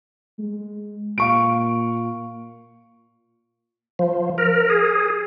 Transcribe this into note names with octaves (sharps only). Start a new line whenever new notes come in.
G#3
A#2 F5 C#6 D7
F3
A#4
G#4